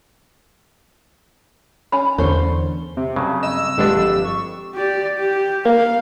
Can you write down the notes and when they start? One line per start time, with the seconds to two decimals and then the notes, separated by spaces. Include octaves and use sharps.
1.92 C#4 G#5 B5
2.18 E2 D3 A3 C#4 C5
2.97 C3 C4
3.16 G2 C#3 F#3
3.43 D#5 E6
3.78 G1 G2 D3 G#3 D4 G4 B4
3.95 F2 G4
4.24 C#6
4.74 G4 D5
5.17 G4
5.65 A#3 F5